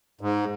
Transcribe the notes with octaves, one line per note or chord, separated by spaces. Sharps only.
G#2